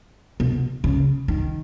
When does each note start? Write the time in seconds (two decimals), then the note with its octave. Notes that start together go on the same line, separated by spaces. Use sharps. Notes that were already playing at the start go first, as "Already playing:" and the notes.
0.40 B2
0.84 C#3
1.28 D#3